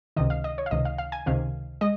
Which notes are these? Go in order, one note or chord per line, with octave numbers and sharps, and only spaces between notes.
C#2 C3 D#3 D#5
F5
D#5
C#5
F5
C#2 C3 D#3 D#5
F5
F5
G#5
C#2 C3 D#3 F5
G#3 D#5